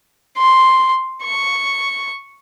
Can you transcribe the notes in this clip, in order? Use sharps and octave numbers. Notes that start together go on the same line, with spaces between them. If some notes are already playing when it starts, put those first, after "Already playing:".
C6
C#6